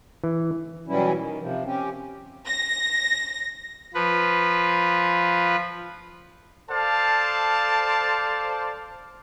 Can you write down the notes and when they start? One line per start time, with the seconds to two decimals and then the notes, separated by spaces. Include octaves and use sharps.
0.24 E3
0.88 B2 E3 F#3 G3 C#4 E4
1.17 D#3
1.40 C3 F3
1.64 C4 C#4 G4
2.47 A#6
3.94 F3 B4
6.70 A4 C5 D5 F5 A5